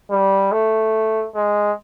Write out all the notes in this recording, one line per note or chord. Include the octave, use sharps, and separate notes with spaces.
G3
A3
G#3